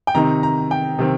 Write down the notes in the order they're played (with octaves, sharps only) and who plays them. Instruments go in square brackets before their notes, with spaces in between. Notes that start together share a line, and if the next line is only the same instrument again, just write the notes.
[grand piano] G5
C3 D#3 C4 D#4 A#5
A#5
G5
C3 D#3 C4